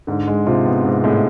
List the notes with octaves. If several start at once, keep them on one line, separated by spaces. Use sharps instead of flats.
G#2 D3
G#3
C3 F4
B3
G#2 C3
A2 G#3